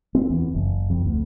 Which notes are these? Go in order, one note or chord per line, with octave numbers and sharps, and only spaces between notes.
C4
E2
F#1
F2
D2